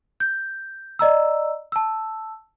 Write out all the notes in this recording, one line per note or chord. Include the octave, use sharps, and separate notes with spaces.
G6
D5 D#5 A#5 E6
A5 E6